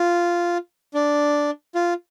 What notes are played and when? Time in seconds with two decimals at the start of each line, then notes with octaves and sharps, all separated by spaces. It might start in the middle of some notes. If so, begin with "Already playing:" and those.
Already playing: F4
0.94 D4
1.75 F4